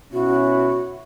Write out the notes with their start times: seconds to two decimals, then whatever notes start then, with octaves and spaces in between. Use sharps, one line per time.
0.13 B2 C#4 E4 F#4